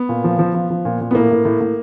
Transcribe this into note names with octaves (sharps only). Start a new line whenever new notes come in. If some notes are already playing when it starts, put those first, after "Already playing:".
Already playing: B3
A#2
F3
F3
F3
F3
A#2
A#2
B3
A2 A#3
A2
A2
A2